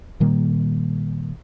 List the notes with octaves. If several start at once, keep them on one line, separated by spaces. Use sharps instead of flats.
A#2 D#3 G3 A#3